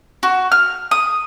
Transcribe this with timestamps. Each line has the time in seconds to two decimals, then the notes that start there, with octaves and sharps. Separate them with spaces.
0.23 F#4
0.52 F6
0.91 D#6